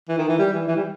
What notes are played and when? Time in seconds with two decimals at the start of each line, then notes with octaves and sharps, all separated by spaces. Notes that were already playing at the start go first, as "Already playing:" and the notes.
0.09 E3
0.18 D#3
0.28 E3
0.38 G3
0.53 E3
0.68 E3
0.76 G3